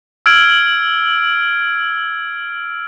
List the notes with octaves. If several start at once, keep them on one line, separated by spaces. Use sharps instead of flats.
E6 F6 G#6 D7 F#7